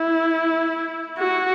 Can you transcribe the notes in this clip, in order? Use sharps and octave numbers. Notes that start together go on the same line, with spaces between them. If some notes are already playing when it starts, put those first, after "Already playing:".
Already playing: E4
F#4